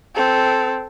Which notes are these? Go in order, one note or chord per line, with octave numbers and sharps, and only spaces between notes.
C4 A4